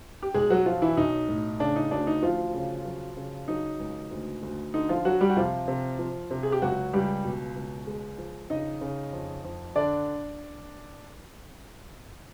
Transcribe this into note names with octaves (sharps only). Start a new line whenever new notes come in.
G4
B1 G#3 G#4
F#3 F#4
F3 F#3 F4
E3 E4
B1 D#4
A2
C#3 D4
D#4
D2 D4
D#4
D2 F3 F4
C#3
F#3
C#3
F#3 D#4
C#2
D2
D2
D3 D#4
F3 F4
F#3 F#4
G3 G4
F#4
C3 F3 F4
C3
F3
C3
G#4
G4
C#2 F#3 F#4
C#2 G3 G4
B2
C#2
G#3
F3
C#3 D#4 D#5
C#3
F2
F2
D3 D4 D5